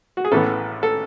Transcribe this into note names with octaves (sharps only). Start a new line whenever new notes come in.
F#4
G#4
A1 A2 E3 B3 A4
A4